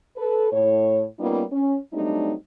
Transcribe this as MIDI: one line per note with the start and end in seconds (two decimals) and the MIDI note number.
0.17 0.48 69
0.17 0.48 71
0.52 1.05 45
0.52 1.05 73
1.20 1.44 55
1.20 1.44 58
1.20 1.44 59
1.20 1.44 61
1.20 1.44 63
1.20 1.44 65
1.52 1.78 61
1.94 2.33 54
1.94 2.33 55
1.94 2.33 57
1.94 2.33 60
1.94 2.33 62
1.94 2.33 63